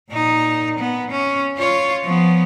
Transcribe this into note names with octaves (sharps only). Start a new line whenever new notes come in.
A#2 D#4
B3
C#4
F4 C#5
F3 B3